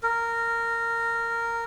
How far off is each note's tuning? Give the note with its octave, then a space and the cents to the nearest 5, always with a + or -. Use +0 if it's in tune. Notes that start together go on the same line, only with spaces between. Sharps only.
A#4 -15